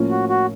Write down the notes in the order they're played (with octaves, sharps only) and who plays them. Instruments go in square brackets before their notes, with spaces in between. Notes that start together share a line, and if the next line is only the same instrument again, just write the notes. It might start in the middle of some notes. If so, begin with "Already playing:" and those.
Already playing: [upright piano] A2 F3 A#3 C#4 F4
[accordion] F#4
F#4